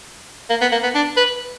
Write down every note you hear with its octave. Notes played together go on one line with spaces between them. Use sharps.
A#3
B3
A#3
B3
D4
B4